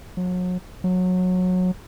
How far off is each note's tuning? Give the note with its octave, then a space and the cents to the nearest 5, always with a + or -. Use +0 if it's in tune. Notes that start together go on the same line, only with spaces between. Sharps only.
F#3 -35
F#3 -20